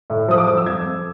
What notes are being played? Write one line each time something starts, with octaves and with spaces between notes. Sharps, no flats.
A2
F3 D#6
D6
F3 D#6
E6
F2 G#6
F2